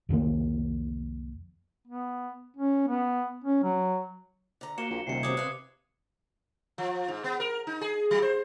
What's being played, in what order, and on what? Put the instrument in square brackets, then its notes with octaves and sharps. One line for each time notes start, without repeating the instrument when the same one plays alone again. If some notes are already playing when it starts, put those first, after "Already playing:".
[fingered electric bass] C2 F2 D#3 A#3
[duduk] B3
C#4
B3
C#4
F#3
[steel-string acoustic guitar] D3 A#5
[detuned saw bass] A#3 [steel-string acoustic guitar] F#4 [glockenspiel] C#7 E7 G7
[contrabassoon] A#1
[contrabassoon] D#1 [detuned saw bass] C3 [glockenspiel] C7 C#7
[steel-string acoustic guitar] G2 F#3 C4 [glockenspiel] D6 D#6 G#6
[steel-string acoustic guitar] B4 E5 F5
[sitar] F3
G#2
B3
A#4
D#4
G#4
F#3
C5